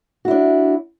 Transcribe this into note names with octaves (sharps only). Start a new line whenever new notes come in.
D4 E4 F#4